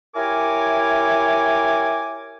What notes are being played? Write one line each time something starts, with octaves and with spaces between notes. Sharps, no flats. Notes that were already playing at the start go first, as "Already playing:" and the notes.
E4 G4 A#4 C#5 G#5 D6